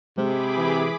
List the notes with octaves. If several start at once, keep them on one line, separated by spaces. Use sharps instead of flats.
C3 G#3 G#4 C5 B5 D6
E3